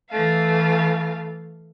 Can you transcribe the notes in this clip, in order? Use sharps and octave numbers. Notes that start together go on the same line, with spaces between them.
E3 A3 F5